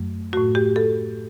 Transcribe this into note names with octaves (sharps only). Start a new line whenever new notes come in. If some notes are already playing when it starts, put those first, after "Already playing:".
Already playing: F#2 F#3 A3
A2 A3 F#4
G4
A4